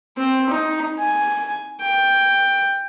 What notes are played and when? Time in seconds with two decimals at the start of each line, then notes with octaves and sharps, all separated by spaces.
0.17 C4
0.50 D#4
0.99 G#5
1.81 G5